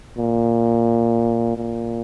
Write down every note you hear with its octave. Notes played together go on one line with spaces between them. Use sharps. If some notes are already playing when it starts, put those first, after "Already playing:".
A#2
A#2